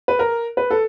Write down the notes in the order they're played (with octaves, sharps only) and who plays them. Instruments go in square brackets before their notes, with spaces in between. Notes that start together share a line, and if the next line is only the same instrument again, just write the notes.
[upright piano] B4
A#4
B4
A4